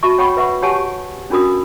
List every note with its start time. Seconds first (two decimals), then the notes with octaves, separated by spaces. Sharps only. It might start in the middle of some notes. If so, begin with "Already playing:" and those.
0.03 F#4 E5 A5 C#6
0.18 C#5 F#5 G5 B5 C#6
0.37 B4 E5 F#5 C#6
0.62 G4 C#5 F#5 G#5 A5 C#6
1.30 C#4 D4 F#4 A#4 D#6